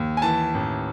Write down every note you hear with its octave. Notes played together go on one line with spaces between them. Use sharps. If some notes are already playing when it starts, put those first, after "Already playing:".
Already playing: D#2
G#5
E3 A5
A1